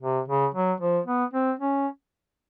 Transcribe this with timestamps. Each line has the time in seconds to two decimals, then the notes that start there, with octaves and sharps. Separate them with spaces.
0.02 C3
0.28 C#3
0.54 F#3
0.80 F3
1.06 B3
1.33 C4
1.59 C#4